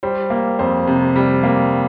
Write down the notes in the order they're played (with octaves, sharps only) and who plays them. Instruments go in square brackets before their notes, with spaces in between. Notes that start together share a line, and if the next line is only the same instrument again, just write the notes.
[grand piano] G3 C5
A#3
F2 C5
C3
G3
A#3